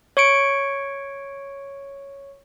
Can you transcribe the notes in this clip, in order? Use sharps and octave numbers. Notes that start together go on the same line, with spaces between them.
C#5 C#6 C#7 D7